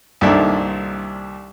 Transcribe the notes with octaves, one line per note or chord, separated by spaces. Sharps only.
C2 A#2 D#3 D4 A4 E5